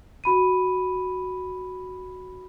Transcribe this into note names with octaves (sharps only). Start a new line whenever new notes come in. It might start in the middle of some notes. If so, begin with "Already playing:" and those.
F#4 B5 D#7